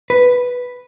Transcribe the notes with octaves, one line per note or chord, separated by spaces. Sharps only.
B4